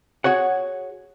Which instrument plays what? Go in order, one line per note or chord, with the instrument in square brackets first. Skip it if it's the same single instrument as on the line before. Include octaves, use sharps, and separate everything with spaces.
[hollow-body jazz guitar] F#4 G#4 C#5 F#5